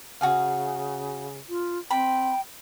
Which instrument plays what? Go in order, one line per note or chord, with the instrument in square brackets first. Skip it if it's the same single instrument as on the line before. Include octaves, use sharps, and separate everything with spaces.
[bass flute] C#3 [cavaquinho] F#4 G#4 F5
[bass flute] F4
[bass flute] C4 [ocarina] G5 [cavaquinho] B5